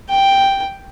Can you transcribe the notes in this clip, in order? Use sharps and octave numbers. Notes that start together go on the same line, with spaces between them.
G5